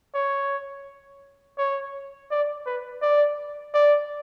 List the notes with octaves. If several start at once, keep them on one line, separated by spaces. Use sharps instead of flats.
C#5
C#5
D5
B4
D5
D5